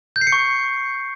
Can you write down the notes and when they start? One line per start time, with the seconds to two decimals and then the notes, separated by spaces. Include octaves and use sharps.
0.16 G6
0.21 C7
0.27 C#7
0.32 C#6